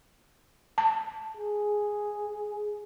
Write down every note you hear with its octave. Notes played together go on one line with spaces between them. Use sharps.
A5
G#4